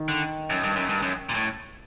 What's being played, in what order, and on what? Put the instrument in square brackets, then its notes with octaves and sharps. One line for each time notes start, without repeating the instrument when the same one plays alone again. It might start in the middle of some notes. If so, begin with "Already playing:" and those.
Already playing: [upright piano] D#3
[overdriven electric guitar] D3
F#2
G2
F#2
G2
F#2
A#2
A2